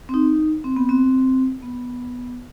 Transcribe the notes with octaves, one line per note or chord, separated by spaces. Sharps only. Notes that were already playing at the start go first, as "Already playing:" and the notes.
C4
D#4
C4
B3
C4
B3